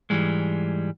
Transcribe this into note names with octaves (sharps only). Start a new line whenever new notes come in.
G#2 E3 G3 G#3